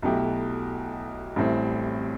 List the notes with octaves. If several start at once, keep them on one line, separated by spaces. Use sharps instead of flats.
B1 B2 A3 E4 G4
A1 A2 G3 C4 E4